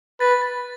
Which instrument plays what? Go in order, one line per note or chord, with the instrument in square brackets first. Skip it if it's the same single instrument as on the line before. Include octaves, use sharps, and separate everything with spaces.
[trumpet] B4 [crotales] A6
[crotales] A6